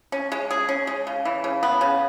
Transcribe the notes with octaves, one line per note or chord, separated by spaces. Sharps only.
C#4
G#3
G#4
C#4
G#3
C#3
E3
C#3
B3
C#3